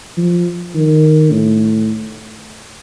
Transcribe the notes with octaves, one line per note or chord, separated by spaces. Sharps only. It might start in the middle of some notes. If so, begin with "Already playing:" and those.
F3
D#3
A2